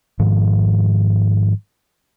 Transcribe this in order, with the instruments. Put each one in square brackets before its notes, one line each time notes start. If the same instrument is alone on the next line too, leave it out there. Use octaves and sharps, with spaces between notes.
[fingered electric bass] G#2 D#3 F3